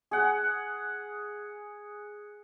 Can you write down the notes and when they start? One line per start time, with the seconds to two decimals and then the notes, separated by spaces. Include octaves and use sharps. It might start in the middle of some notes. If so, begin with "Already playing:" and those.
0.11 G#4 F#5